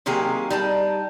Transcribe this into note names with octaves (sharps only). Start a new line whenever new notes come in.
C3 D#3 F#3 A#3 G4 G#4
G3 D#4 A5